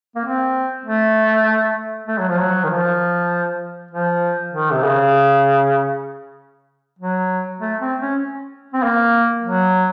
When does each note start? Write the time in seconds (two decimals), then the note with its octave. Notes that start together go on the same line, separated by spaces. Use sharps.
0.16 A#3
0.24 C4
0.86 A3
2.08 A3
2.19 F#3
2.28 F3
2.39 F#3
2.64 D#3
2.69 F3
3.91 F3
4.53 D#3
4.73 C3
4.84 C#3
6.99 F#3
7.60 A3
7.80 C4
8.00 C#4
8.74 C4
8.83 A#3
9.43 F#3